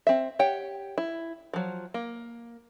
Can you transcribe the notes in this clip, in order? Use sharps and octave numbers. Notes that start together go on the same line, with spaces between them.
C4 E5
G4 C#5 F#5 G5
E4
F3 F#3
A#3